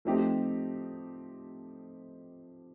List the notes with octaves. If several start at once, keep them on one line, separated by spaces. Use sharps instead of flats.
F3 A3 C4 D#4 G4